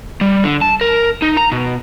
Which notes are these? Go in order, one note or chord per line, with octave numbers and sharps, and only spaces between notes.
G3
D3
A5
A#4
D#4
A#5
B2